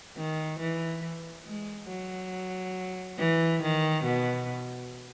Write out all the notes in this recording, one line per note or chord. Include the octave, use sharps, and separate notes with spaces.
D#3
E3
G#3
F#3
E3
D#3
B2